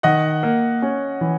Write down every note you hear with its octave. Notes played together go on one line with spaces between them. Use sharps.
D#3 D#5 F#5
A#3
C#4
E3